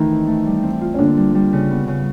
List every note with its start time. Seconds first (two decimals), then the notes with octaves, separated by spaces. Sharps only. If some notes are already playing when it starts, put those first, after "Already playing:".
Already playing: D#3 E3 A3 D#4
0.10 C4
0.27 A3
0.46 G3
0.63 C4
0.81 F4
0.94 C#4
0.99 D3 A#3 D4
1.17 G3
1.35 G3
1.53 C#3
1.71 B3
1.88 C#3